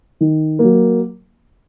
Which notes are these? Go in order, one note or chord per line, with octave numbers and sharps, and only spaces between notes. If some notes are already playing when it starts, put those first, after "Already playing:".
D#3
F#3 A#3